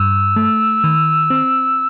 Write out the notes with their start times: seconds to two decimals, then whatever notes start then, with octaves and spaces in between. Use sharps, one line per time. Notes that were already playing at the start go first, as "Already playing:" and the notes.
Already playing: G2 E6
0.36 A3
0.84 D#3
1.30 C4